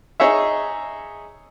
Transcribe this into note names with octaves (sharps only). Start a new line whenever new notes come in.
D#4 G#4 C#5 E5